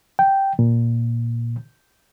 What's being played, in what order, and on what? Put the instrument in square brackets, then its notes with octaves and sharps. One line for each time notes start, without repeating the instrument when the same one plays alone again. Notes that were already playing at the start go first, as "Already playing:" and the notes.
[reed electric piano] G5
A#2